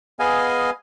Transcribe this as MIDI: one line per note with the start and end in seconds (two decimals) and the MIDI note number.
0.19 0.70 59
0.19 0.70 68
0.19 0.70 75
0.19 0.70 77
0.19 0.70 80